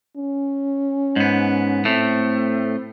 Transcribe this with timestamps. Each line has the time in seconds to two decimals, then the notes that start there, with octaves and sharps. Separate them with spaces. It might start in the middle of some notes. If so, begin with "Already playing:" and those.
0.17 C#4
1.16 G#2 B3
1.85 A2 A3 C4